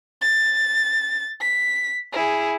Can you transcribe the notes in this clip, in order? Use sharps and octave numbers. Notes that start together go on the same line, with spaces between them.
A6
B6
E4 G#4